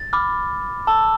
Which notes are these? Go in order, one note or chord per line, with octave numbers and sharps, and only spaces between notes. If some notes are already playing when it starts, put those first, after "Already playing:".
Already playing: A6
B5 D6 F6
A5 E6